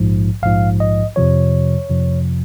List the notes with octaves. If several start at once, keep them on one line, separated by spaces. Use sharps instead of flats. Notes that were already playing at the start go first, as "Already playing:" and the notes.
Already playing: A#1 G#2 F3
A#1 G#2 F3 F5
D#5
F2 C3 F3 C#5
F2 C3 F3